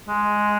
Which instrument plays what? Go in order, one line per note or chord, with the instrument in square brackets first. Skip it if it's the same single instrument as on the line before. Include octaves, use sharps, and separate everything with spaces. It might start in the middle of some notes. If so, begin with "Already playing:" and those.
[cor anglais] G#3